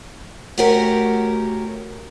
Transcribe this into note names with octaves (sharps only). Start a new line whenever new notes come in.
A3 C#4 F#4 G4 A#4